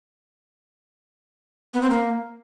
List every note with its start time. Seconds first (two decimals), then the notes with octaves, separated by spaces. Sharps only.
1.74 B3
1.82 C4
1.90 A#3